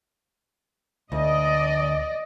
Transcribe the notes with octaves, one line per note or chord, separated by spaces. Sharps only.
D2 D5 D#5